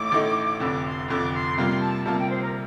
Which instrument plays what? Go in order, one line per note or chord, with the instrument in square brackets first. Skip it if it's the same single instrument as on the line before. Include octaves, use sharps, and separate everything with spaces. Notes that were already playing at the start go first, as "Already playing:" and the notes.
Already playing: [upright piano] A1 A2 A3 D#4 [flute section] D6
[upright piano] A1 A2 A3 D#4
[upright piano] F1 F2 D3 [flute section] D6
[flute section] C6
[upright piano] F1 F2 D3 [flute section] D6
[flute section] C6
[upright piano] C3 G3 A#3 F4 [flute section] C6
[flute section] A5
[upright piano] C3 G3 A#3 F4 [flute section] A5
[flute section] G5
C5
A#4